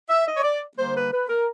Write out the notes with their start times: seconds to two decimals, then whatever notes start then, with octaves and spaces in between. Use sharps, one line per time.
0.09 E5
0.26 D#5
0.37 C#5
0.42 D5
0.77 D3 G3 A#3 C5
0.94 B4
1.12 B4
1.28 A#4